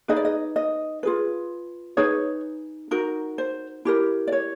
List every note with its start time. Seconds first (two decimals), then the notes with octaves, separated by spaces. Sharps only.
0.08 D#4 G#4 B4 D#5
0.16 D5
0.25 D#5
0.56 D#5
1.03 F4 G#4 B4
1.97 D#4 G#4 B4 C#5
2.91 D#4 F#4 A#4
3.38 C5
3.85 E4 G4 A#4
4.27 D5
4.32 C#5